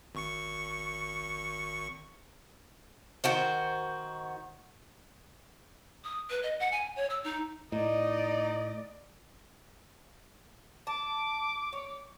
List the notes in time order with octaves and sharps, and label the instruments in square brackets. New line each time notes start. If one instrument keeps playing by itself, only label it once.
[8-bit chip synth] G#1 C#6 C#7
[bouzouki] D#3 F#4 C5
[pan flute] D#6
B4
D#5
F#5
G#5
C#5
E6
D#4
[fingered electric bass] A2 [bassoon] D#4 [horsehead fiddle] D5 D#5
[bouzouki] A5 [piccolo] D6
[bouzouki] C#5